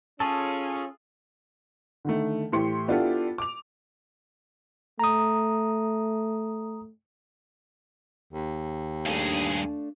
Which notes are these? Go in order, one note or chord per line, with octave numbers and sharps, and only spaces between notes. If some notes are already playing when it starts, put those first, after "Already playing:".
C#4 F4 G#4 A4 A5
D3 D#3 A3
A2 E3 G4 C6 C#7
B3 D4 E4 F4 G4 A4
D6 F7
A3 A#5 D#6
D#2
G2 A3 D4 G#4 F5